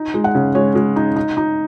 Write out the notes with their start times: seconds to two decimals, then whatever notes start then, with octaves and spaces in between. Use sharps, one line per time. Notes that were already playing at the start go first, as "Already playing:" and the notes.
Already playing: D#4
0.14 G#3
0.24 F#5
0.35 C#3
0.55 G#3 C#5
0.75 G#3
0.96 D#4
1.16 D#4
1.37 D#4